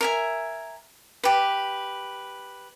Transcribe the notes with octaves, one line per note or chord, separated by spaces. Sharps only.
A#4 E5 G#5
G4 B4